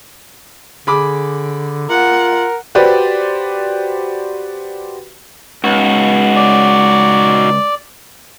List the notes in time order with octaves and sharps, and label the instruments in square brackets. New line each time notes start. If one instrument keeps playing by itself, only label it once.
[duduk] D3 [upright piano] G#4 B5 D6
[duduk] F4 [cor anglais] A#4 [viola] F#5
[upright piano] F#4 G4 B4 C5 D5
[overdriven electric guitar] C#2 [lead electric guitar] D#4 F#4
[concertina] D5